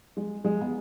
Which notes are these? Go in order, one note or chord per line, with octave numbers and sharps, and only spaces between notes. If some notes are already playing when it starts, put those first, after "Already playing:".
G#3
G#3
B3